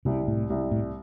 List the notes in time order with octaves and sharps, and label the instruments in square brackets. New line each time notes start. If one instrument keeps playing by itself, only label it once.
[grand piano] C2 [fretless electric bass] C3
[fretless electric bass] A2
[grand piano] C2
[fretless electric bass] A2